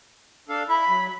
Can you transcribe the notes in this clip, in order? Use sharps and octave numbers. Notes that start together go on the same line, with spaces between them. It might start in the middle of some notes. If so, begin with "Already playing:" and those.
D4 A4 F5
E4 E5 B5
F#3